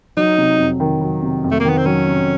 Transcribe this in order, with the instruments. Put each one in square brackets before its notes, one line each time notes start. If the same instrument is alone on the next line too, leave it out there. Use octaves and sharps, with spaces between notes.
[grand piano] F#3 [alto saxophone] D#4
[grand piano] C3
F2
D#3
F#3
C3
F2
[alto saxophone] A3
A#3
[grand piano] D#3 [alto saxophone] B3
[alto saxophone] C4
[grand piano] F#3 [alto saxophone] C#4
[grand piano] C3